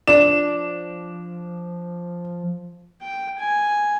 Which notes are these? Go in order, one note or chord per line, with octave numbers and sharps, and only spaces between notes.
F3 D4 E7
G5
G#5